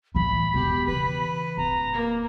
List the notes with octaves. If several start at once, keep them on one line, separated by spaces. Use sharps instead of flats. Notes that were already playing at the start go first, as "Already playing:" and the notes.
A2 E3 B5
E1 G4
C#3 E3 B4
D1 A#5
A#3